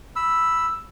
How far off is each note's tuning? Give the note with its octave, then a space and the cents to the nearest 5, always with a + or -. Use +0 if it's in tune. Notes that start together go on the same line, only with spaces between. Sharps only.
B5 +0 E6 +0